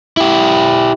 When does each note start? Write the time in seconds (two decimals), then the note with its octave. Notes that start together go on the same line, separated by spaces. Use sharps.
0.17 E4 G4